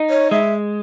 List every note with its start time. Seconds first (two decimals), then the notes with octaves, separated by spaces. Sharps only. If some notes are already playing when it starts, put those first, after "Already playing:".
Already playing: D#4
0.10 C#5
0.31 G#3 E5